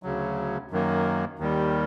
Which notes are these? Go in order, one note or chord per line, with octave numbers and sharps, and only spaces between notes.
D2 C#3 F#3
F#2 D#3 F#3 A#3
D#2 D#3 G3